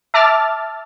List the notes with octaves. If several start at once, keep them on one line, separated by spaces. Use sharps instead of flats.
E5 A5 D6 E6 F6 A6